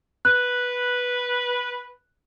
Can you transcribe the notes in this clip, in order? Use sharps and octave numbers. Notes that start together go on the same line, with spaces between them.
B4 F#6